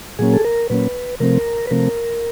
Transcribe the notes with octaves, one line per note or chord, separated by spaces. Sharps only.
A#2 F#3 A#3 C#4 G#4
A4
A#4
A#2 F#3 A#3 C#4 B4
C3 F3 A3 C4 A#4
B4
C3 F3 A3 C4 A#4